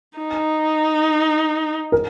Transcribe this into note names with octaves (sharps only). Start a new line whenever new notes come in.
D#4
A#4